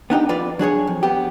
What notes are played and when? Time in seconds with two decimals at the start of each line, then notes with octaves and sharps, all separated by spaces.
0.10 B3 D4 D#4 G4
0.29 F2 F4 B4 D5
0.59 F#3 D4 G#4 C#5
0.87 F2
1.03 B3 G4